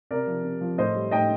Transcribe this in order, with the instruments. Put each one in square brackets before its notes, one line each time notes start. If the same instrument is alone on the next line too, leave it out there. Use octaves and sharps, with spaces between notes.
[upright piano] C3 A#4 D5
F3
C3
F3
A2 C5 D#5
G3
A2 D#5 G5